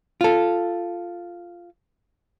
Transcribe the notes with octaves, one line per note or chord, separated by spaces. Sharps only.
F4 A4